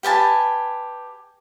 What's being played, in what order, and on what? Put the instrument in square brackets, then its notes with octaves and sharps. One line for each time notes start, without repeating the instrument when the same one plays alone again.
[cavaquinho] G4 B4 G#5 A5